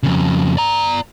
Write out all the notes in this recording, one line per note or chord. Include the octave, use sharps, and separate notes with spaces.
F2 C#3
D5 A#5